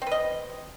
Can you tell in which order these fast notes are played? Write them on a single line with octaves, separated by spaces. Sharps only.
C4 B4 D#5